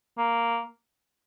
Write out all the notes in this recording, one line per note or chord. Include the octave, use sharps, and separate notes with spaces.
A#3